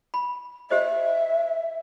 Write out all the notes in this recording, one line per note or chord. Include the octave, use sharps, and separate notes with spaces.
B5
G4 C5 D#5 E5